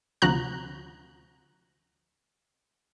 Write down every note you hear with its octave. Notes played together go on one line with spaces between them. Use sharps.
D2 C3 F3 F#4 A#5 F#6